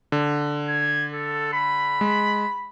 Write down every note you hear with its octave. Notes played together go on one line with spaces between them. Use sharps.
D3
G#6
A4
B5
G#3